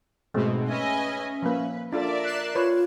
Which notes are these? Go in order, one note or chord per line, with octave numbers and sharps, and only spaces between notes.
G#2 B2 G#3 A3 C4
C#4 B4 D#5 E5 G#5
F3 A#3 B4
D4 F4 A4 A#4 D5 E5
F#6 C7 E7
F4 B4 C#5